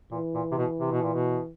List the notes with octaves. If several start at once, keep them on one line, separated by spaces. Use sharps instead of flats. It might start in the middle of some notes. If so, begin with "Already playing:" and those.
A#2 E3
A#2
C3
B2
C3
B2
A#2
B2